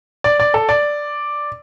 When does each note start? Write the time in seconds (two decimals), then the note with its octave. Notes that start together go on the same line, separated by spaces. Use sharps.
0.24 D5
0.40 D5
0.54 A4
0.69 D5